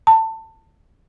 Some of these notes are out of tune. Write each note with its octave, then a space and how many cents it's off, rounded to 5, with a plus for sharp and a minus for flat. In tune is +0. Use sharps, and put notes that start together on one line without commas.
A5 +20